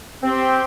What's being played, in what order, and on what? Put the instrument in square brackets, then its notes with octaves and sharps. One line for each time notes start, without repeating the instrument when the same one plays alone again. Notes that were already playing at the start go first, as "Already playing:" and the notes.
[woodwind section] C4 [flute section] G4 C5 G5 C6